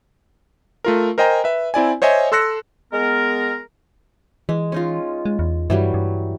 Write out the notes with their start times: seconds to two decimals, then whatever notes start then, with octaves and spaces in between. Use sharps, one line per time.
0.85 A3 F4 A#4
1.18 A#4 C5 D#5 G5 G#5 A#5
1.44 B4 E5
1.74 C4 E4 D5 G#5
2.02 C5 C#5 D#5 E5 G#5
2.32 A4 C6 E6 F#6 A#6 C#7
2.93 G#3 B3 A#4
4.49 E3 G#3
4.72 C#4 D#4 F4
5.25 G#3
5.39 E2
5.70 G2 E3 F#3 G3
5.94 G2